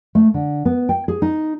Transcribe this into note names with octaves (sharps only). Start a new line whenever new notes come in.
A3
D3
B3
G5
G#4
D#4